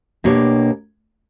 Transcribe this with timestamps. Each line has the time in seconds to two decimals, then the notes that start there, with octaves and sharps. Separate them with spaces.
0.24 B2 A#3 D4 G4 C#5